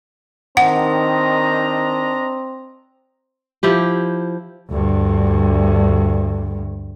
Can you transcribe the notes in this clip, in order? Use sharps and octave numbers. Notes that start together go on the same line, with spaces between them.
D#3 C4 D4 D#5 F#5 A#5
F3 E4 G4
D2 G2